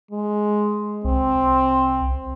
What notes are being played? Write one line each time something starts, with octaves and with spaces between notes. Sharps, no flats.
G#3
C2 C4